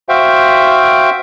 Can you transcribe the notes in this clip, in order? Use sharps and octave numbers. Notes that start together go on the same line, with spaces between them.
F#4 C5 E5 F5 G5